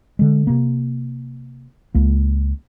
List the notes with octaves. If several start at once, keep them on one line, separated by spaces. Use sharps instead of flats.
D3 G#3
C3 A#3
C#2 A#3